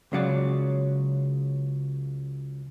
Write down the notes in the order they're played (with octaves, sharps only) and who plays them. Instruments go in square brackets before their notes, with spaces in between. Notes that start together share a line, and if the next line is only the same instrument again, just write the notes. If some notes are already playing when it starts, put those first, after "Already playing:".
[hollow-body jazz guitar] C#2 C#3 F#3 D5